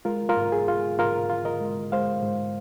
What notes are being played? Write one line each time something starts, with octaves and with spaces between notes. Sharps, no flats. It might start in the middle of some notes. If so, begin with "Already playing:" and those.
G#3 F4 A#4
F4 A#4
G#2
G#4
F4
G#2 F4 A#4
F4
A#4 D#5
G#3
G#3 C5 F5
G#2